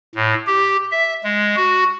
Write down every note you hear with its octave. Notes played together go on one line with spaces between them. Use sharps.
A2
G4
E5
G#3
F#4